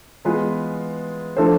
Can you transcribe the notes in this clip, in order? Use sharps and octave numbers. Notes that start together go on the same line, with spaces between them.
E3 G#3 B3 F4 B4
F3 A3 D4 A4 C5